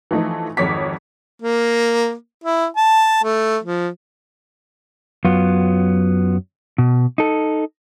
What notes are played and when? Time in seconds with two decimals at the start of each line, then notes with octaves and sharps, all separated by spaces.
0.11 E3 F3 A3 D#4
0.57 G#1 F2 C#5 D6 B6
1.42 A#3
2.44 E4
2.76 A5
3.24 A3
3.63 F3
5.25 F#2 F#3 B3 F4
6.78 B2
7.18 D#4 A4